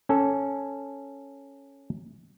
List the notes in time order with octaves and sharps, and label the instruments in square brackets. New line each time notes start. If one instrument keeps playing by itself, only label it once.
[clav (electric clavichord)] C#4 A4